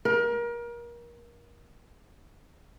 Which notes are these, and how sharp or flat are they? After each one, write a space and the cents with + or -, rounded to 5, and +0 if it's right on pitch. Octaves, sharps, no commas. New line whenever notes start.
A#4 +30